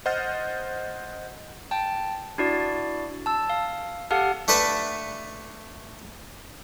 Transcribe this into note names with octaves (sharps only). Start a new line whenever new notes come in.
C5 D#5 F#5 F6 G6 A6
G5 A5
D4 E4 F#4 D5
A5 E6
F5
G4 A4 F5 F#5 A5 F6
A3 D4 A4 B4 E5